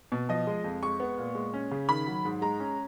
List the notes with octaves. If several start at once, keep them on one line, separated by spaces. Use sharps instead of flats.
B2
F3 D#5
G#3
F2
G#3 C#6
B3
A#2
G#3
C#4
C#3
D#3 B5
F#3
G#2
G#3 A#5
C#4